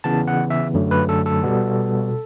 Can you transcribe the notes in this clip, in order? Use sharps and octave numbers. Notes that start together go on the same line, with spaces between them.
C#3 E3 B3 A5
F#5
E5
F#2 D3 F#3 A3
B4
A4
A4
B2 G3 B3